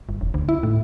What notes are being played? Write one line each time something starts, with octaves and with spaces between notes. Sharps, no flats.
G1
E1
D2
E4
A2